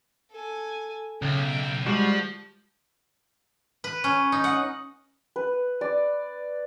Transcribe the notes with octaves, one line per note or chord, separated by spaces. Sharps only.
A4 G#5
B1 C#3 E5 G5
F3 G3 G#3 F#4
B4
C#4
D#4
F#5
B4
D5